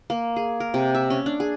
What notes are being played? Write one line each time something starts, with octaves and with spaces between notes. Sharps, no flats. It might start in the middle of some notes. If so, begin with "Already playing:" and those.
A#3
G#4
A#4
C3
E5
C#4
D4
G#4